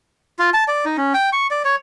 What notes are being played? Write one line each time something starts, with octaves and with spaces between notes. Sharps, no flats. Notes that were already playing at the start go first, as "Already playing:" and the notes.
F4
A5
D5
D#4
C#4
G5
C#6
D5
C#5